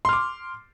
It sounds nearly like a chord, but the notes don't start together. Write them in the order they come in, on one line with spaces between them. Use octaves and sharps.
C6 F6 D6